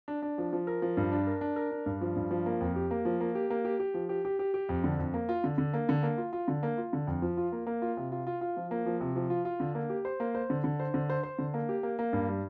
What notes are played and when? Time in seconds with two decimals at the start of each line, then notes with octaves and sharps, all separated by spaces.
0.08 D4
0.22 D4
0.38 F3
0.53 F3
0.67 A#4
0.82 F3
0.97 G2
1.12 D4
1.27 A#4
1.41 D4
1.56 A#4
1.71 D4
1.86 G2
2.01 F3
2.16 G2
2.31 F3
2.46 A#3
2.61 F2
2.76 G4
2.91 A#3
3.05 F3
3.21 A#3
3.35 G4
3.50 A#3
3.65 G4
3.80 G4
3.94 F3
4.09 G4
4.25 G4
4.39 G4
4.54 G4
4.69 F2
4.84 D3
4.99 F2
5.14 A#3
5.29 F4
5.44 D3
5.58 D3
5.74 A#3
5.89 D3
6.03 A#3
6.18 F4
6.33 F4
6.48 D3
6.63 A#3
6.78 F4
6.93 D3
7.07 F2
7.22 F3
7.37 F4
7.52 A#3
7.67 A#3
7.82 F4
7.97 C3
8.12 F4
8.27 F4
8.41 F4
8.57 F3
8.71 A#3
8.86 F3
9.01 C3
9.16 F3
9.30 F4
9.45 F4
9.60 D3
9.75 A#3
9.90 G4
10.05 C5
10.20 A#3
10.35 C5
10.50 D3
10.64 D3
10.80 C5
10.94 D3
11.10 C5
11.23 C5
11.38 D3
11.54 A#3
11.69 G4
11.83 A#3
11.99 A#3
12.13 G2
12.28 G3